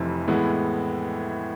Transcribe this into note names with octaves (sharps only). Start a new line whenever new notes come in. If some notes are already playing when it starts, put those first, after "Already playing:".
Already playing: F1 F2 C3 E3
A2 E3 G#3 B3